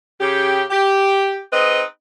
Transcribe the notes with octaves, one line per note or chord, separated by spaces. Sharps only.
C#3 G4
G4
C4 D#4 G#4 B4 D#5